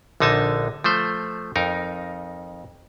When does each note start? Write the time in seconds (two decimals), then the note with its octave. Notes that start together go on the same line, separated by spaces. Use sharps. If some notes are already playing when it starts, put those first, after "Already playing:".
0.20 A#1 D3 D#4 G#5 A5
0.84 F3 A3 C5
1.56 F2 D#4 A#4